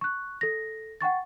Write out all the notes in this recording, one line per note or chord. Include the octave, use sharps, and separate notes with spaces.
C#6 F#6
A4 A#6
F#5 G5 C#6 A6